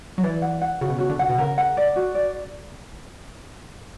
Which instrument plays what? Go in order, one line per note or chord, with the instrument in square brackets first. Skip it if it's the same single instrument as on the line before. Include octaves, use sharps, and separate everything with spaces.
[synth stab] F#3
[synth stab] E3 [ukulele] D5
[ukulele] F#5
F#5
[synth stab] C#3 [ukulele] F#4
[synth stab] B2
[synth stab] C#3 [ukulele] F#4
[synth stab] D3
[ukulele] F#5
[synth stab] B2
[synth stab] C#3 [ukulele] A#4
[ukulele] F#5
D5
F#4
D5